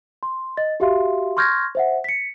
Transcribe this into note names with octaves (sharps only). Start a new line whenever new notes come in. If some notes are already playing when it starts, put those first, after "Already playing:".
C6
D#5 A6
F#4 G4 E5 F5 C6
C6 C#6 F6 G6 G#6 A#6
C5 E5 F#5
B6 C#7